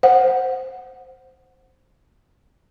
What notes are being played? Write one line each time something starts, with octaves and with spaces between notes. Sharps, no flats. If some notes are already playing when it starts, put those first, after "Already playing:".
C5 F#5